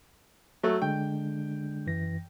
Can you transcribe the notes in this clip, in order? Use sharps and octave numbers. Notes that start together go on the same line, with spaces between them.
F#3 A3
D3 G#3 D4 G5
F#2 E3 A#6